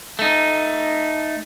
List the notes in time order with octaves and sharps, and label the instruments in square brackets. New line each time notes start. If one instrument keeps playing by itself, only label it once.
[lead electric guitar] A3 D#4